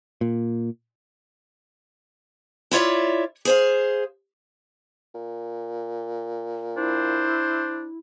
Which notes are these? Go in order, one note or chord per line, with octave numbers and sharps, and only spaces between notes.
A#2
E4 F4 C#5 D5 E5
G#4 C5 F5
A#2
D4 E4 C5